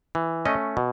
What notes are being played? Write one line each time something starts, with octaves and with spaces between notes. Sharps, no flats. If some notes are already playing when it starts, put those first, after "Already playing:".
E3
A3 C#4 D#5
B2